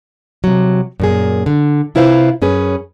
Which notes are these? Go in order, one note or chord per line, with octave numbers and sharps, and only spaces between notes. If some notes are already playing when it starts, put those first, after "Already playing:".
C3 F#3
F#2 A#2 G#4
D3
C3 E4 F4 B4 C5 F5
F#2 C#4 G#4 B4